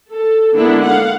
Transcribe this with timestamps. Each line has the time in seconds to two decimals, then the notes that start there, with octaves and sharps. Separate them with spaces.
0.11 A4
0.55 D3 G#3 A#3 B3 D4 E4
0.85 F5 F#5